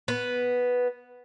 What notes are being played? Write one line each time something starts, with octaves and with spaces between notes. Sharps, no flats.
B3